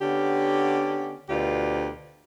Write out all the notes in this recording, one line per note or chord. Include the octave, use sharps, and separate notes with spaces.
D3 B3 C#4 G4
D2 B2 D4 F4 G4